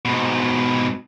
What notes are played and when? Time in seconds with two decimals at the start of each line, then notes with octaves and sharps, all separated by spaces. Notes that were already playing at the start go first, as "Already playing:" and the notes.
0.05 G#2 B2